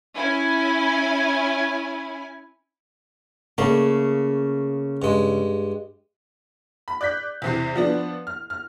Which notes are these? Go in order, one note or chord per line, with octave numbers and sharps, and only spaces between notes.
C#4 E4 G#5
C#3 A3 A#3
G2 G#3
B5
D5 F#6 G6 B6
E2 C3 C7
F3 B3 D4
F6
F6